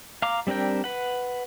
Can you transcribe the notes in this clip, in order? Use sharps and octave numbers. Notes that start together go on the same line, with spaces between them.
F5 A#5 D6
G3 C4 D4 A#4 G5
B4 F#5